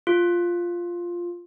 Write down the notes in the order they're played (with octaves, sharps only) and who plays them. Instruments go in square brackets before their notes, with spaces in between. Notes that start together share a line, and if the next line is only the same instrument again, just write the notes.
[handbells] F4